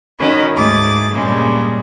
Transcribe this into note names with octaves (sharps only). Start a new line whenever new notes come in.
D#3 C#4 E4 F#4
D2 G#2 A3 G#4 D6 A6
G2 A#2 C#3 G3 G#3